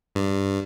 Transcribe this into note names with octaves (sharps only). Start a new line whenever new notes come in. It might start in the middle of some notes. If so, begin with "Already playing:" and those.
G2